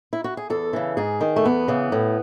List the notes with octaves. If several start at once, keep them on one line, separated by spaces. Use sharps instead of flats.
E4
F#4
G#4
E2 A4
C#3 E3
G#2 G#4
D#3
A3
E2 B3
C#3 E3
A2